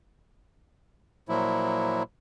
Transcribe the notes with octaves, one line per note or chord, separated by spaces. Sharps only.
A#2 F3 F#3 E4